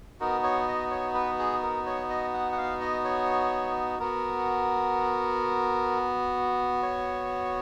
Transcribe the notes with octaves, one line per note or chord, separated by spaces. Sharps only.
B3 D#4 F#4 A#4
C#5
D#5
C#5
B4
G#4
A#4
C#5
D#5
F#5
F#5
F5
D#5
C#5
B3 F#4 A#4
C#5